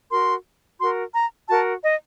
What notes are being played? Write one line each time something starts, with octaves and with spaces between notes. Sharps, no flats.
F#4 A#4 C6
F#4 A#4 C6
A#5
F#4 A#4 A5
D#5